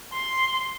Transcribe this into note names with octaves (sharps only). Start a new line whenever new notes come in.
C6